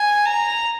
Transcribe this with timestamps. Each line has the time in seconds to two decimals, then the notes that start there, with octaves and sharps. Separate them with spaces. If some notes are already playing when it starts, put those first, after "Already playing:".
Already playing: G#5
0.25 A#5